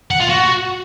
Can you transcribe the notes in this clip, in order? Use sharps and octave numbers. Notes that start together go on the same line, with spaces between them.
F#5
F4
F#4